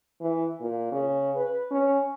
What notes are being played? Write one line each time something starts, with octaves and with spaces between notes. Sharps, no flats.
E3
A#2
C#3
B4
C#4